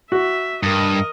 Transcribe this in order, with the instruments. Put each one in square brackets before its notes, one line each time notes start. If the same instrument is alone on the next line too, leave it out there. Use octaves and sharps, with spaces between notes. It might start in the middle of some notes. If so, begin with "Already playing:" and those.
[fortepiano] F#4 [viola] E5
[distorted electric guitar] G2 [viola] A#4 D#5